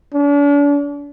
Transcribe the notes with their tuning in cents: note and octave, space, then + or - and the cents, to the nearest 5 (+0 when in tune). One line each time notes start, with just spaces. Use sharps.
D4 -40